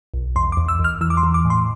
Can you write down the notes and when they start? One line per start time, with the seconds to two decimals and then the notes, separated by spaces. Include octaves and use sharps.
0.14 B1
0.36 E2 C6
0.52 D6
0.57 E2
0.68 E6
0.79 E2
0.84 F6
1.01 E3 E6
1.10 D6
1.17 C6
1.23 E3
1.34 D6
1.45 A2
1.50 C6